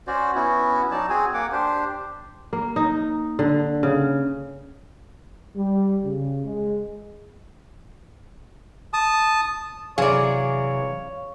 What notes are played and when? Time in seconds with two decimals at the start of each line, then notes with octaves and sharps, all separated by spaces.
0.07 C#4 F#4 C5 D5
0.35 B3 C#4 E4 F#4
0.91 F#3 D#4 D5 A5
1.10 C4 F#4 G#4 G#5
1.34 A#3 F#5 D6
1.52 D4 G4 C5
2.53 A#3
2.76 D#4
3.39 D3
3.83 C#3
5.56 G3
6.05 C#3
6.44 G#3
8.93 A5 D#6
9.98 C3 E3 F#3 G#4 C#5 D5 F5